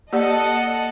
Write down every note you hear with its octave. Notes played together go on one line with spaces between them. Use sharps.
A#3 G4 A4 D5 D#5 F#5